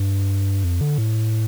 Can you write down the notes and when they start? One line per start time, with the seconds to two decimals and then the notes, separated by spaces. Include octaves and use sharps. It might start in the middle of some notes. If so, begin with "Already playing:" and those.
Already playing: G2
0.64 F2
0.81 D3
0.98 A2